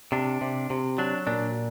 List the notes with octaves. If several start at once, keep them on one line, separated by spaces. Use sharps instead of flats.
C3 D4
C3
C3
F#3 D4
A#2 D4